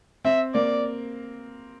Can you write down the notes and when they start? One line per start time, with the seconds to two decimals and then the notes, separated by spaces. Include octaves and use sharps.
0.25 C4 E5
0.54 A#3 D5